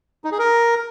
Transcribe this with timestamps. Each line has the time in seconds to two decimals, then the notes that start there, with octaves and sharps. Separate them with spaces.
0.24 D#4
0.32 G#4
0.39 A#4